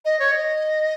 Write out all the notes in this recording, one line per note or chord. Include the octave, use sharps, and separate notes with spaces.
D#5
C#5
D#5